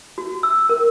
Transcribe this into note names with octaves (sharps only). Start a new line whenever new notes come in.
F#4
E6
A#4